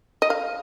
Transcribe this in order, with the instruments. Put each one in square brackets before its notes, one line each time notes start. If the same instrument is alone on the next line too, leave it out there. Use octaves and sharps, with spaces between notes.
[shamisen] D#5
F5